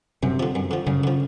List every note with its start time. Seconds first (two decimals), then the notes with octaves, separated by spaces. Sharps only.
0.23 F#2 C3
0.40 D3 F3
0.55 F#2
0.71 D3 F3
0.87 F#2 C#3
1.04 D3 F3